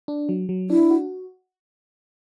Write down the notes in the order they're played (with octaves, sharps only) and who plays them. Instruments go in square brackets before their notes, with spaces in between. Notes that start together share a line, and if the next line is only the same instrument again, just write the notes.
[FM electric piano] D4
F#3
F#3
[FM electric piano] D4 [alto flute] E4
[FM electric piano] F#4